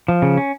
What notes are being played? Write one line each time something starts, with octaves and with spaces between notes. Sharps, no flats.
F3
C#3
C#4